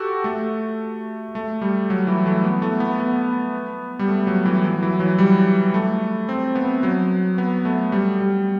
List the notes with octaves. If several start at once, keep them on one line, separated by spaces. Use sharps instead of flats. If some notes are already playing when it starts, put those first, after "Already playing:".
Already playing: F#4 G4 A4
A3
A3
G3
F#3
E3
A3
B3
A3
B3
B3
G3
A3
F#3
E3
F#3
E3
F#3
G3
A3
C4
B3
F#3
B3
A3
G3
G3